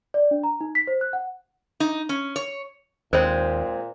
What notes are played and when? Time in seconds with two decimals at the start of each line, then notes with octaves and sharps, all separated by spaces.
0.14 D5
0.31 D4
0.43 A#5
0.61 D#4
0.75 B6
0.87 C5
1.01 F#6
1.13 F#5
1.80 D#4
2.09 C#4
2.36 C#5
3.13 D#2 A#2 G#3 C4 C5 C#5